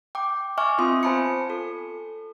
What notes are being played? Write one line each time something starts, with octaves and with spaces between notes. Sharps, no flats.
G5 D6
D#5 E5 G#5 C#6 D6 F6
B3 C4 F4 C6 D#6
F4 C5 G#5 A5 B5 C#7
A4